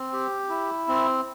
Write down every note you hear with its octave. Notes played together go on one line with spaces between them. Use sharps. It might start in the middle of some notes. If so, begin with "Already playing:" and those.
Already playing: C4
G4
E4
C4